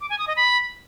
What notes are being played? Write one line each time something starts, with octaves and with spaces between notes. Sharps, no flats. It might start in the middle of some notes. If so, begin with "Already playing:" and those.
D6
G#5
D#6
D#5
B5